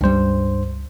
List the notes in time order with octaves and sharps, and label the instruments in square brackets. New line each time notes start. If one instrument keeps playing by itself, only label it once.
[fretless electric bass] C#2 G3 [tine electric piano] G2 C5